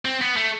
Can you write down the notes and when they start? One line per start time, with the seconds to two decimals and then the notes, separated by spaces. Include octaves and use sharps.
0.05 C4
0.22 B3
0.37 A3